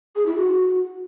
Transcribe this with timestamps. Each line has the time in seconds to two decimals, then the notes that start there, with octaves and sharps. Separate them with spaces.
0.16 G#4
0.26 E4
0.36 F#4